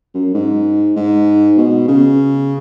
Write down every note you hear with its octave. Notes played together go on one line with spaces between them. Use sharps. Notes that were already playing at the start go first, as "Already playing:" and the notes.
F#2
G#2
G#2
B2
C#3